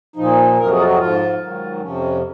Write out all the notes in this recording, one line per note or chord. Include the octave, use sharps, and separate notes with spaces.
A#2 F3 D#4
F2 C3 F#3 A#4
G#4
F4
F#4
G#2 F3 F4
G#2 D#3 F#3
F2 C3 F3 C#4